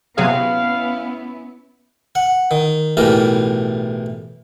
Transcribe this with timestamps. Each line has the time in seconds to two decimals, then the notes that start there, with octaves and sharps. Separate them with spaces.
0.18 C3 F#3 B3 C#4 E4 G#4 F5
2.15 F#5
2.51 D#3
2.97 B1 A2 E3 G3 A#4